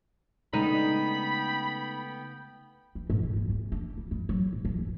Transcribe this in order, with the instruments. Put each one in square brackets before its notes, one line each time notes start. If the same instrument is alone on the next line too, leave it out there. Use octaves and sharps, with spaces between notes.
[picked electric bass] C#3 G#3 A3 [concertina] B3 G5 [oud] D#4 [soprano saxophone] B5
[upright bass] E3
G#2
C3
F#2
E2
D4
E4
G2
F#3
G#2
D#2
E3